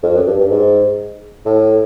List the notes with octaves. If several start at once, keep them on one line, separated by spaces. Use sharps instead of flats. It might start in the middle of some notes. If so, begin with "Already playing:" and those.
F2
F#2
G2
G2
G#2
A2